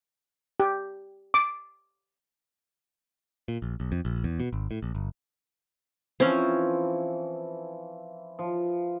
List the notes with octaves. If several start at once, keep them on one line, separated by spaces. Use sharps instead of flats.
G4
D6
A#2
A#1
B1
F2
A#1
E2
B2
G#1
A2
A#1
G1
E3 F3 C4 C#4
F3